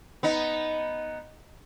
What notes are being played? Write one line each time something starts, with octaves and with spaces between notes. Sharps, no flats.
B3 D#4